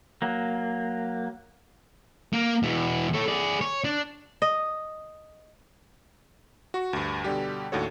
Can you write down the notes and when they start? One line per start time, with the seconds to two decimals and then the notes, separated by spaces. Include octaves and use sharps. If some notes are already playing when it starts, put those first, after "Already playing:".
0.22 F#3 A#3
2.33 A#3
2.63 E2 B2
3.14 A4 C#5
3.28 G#4 D5
3.61 C#5
3.84 D4
4.42 D#5
6.74 F#4 C#6
6.93 D2 G2
7.24 B2 D3 G3 G4
7.72 D#2 A2 D4 F#4 A4 C#5